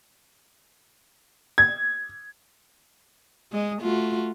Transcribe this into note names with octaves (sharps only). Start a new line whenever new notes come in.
G#6
G#3 D#5
A3 F4 F#4